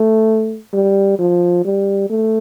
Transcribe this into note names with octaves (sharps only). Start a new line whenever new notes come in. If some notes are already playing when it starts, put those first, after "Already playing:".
Already playing: A3
G3
F3
G3
A3